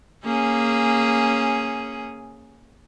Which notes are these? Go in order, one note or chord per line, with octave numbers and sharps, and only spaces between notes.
A#3 C#4 G#4